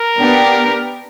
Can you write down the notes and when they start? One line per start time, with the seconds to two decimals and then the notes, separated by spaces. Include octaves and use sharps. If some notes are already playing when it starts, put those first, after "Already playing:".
Already playing: A#4
0.19 B3 D4 G4